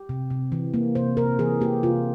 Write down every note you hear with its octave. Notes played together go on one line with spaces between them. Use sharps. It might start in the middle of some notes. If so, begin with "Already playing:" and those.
Already playing: G4
C3
C3
E3
A#3
C3 C5
C3 A#4
E3 G#4
A#3 G4
C3 F4